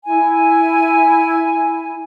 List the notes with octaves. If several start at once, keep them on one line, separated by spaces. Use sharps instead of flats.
E4 G#5